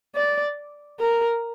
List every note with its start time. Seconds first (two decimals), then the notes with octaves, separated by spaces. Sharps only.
0.15 D5
0.99 A#4